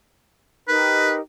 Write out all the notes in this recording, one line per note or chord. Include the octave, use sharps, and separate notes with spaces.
D#4 G4 A#4 B4